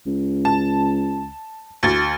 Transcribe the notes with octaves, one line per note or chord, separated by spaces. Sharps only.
C#2
A5
D2 A6